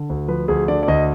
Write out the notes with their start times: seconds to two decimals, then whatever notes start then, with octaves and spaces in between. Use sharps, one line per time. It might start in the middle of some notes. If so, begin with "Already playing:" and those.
Already playing: D3
0.10 D2
0.28 F3 B4
0.48 D2 G#4
0.68 D3 D5
0.83 D5
0.88 D2 D#5